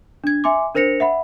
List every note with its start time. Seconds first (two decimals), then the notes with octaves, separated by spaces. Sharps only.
0.24 D4 G#6
0.44 E5 G#5 C6 D6
0.74 D4 A#4 C5 A#6 C#7 F7
1.00 E5 F#5 B5